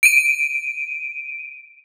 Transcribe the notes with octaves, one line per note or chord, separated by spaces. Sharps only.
D7 D#7